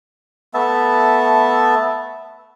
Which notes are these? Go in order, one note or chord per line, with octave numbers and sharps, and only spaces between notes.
A3 B3 E5 A5